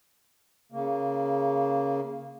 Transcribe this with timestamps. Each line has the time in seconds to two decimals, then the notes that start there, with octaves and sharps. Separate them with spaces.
0.72 C#3 A#3